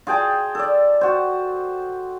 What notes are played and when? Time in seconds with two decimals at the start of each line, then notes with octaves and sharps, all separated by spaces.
0.07 F4 G#4 G5 A5
0.55 A4 D5
1.01 F#4 C5